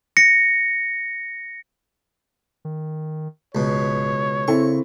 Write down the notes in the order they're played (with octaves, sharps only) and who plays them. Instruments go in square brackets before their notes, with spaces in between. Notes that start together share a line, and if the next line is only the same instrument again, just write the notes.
[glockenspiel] A#6 C#7
[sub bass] D#3
[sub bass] D1 [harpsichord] C#2 B2 [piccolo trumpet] C#5
[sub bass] C#3 [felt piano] C4 E4 A4 [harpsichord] C#6